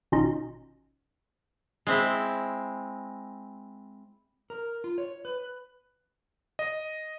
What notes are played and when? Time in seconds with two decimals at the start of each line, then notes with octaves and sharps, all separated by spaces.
0.12 G#1 B2 C#4 D#4 F4 D#5
1.87 G#3 C4 E4
4.50 A#4
4.84 F4
4.98 C#5
5.25 B4
6.59 D#5